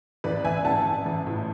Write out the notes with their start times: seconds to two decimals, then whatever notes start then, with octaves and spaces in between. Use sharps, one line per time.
0.24 A1 B4 D5
0.44 A1 E5 G#5
0.65 A1 F#5 A5
0.86 A1
1.06 A1
1.27 A2